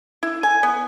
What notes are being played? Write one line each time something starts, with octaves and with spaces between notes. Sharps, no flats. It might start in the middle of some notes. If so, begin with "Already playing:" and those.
E4
G#5
B3